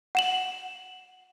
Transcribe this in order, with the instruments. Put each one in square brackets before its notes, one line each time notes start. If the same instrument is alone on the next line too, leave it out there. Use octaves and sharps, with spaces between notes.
[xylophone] F#5 E7 F#7